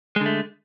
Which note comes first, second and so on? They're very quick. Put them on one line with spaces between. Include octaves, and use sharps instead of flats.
G#3 D3 A3